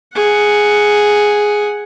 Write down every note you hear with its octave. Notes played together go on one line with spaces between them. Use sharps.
G#4 F#5